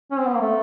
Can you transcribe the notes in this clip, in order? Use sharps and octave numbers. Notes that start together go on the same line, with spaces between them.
C#4
C4
B3
A#3
A3